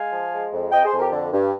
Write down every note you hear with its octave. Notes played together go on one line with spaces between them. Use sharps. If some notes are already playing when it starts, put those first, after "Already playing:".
Already playing: G#3 F5 G#5
F3
G#3
F2
F2 D#5 G5
G#4 C5
F2
G4 A#4
D3
G2